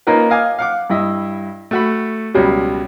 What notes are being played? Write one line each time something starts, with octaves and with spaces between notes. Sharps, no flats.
A#3 C#4 D#4 F4 A#4 B4
D#5 F5 G#5 D6
F5 F#5 D6
G2 E4 D#5 E5
A3 F#4 B5
C#2 B2 F#3 G3 C#4